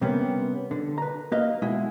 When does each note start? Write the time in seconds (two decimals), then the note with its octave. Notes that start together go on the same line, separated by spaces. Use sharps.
0.01 C3 G3 A#3 B3 C#4
0.71 D3
0.98 B4 A#5
1.32 A#3 B4 D#5 F5
1.62 B2 G#3 E4